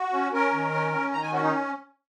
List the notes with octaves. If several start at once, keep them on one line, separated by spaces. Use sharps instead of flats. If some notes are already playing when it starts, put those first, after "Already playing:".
Already playing: F#4
C#4
C#4 A#4
D#3
C#4
C#4
D#3 A#5
G#5
C#4 F#4
D#4